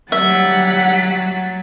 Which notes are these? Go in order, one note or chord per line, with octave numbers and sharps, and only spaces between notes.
F#3 G3 E5 F#5 A6 B6